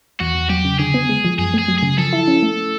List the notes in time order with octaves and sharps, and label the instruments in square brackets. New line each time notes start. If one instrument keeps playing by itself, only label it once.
[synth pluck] E2 [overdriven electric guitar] F#4
[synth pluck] E2
[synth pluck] F#3 [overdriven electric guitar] G4
[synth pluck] C#3
[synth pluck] D3 [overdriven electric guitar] G#4
[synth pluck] B3
G#3
F3
[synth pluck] F#2 [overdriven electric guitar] G#4
[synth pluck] A3 [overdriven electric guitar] G#4
[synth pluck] F#3
[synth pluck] C#3 [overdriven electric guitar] G#4
[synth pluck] F3 [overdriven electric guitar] A4
[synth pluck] E4
C#4
A3